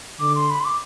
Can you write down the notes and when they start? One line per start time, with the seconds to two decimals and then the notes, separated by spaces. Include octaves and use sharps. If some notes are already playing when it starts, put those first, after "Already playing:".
0.20 D3 D6
0.35 C6
0.50 B5
0.60 C6
0.65 D6